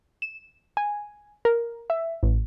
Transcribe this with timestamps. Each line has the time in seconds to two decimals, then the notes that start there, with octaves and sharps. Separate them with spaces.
0.22 E7
0.77 G#5
1.45 A#4
1.90 E5
2.23 A1